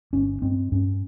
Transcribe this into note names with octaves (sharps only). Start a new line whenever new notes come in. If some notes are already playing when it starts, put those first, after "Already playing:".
G1 C#4
G2 C4
G2 C#4